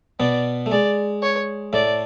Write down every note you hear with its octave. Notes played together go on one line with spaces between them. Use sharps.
B2 B3 D5
A3
G#3 D5
C#5
A2 A3 D5